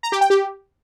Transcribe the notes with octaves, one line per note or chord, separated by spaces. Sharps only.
A#5
G4
G5
G4